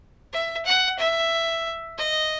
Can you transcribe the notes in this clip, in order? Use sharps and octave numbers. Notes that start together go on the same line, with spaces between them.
E5
F#5
E5
D#5